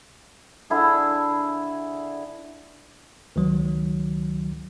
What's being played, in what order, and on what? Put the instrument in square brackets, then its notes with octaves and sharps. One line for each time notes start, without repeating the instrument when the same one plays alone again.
[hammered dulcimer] D3 E4 G#4
[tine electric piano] C#2 D#3 F#3